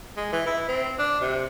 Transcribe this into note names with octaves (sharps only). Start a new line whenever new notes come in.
G#3
E3
E4
C4
D4
C3